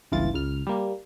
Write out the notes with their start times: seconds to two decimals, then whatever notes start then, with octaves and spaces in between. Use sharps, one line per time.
0.12 G1 C#2 E3 F4 A6
0.34 C#2 F6
0.67 G3 A#3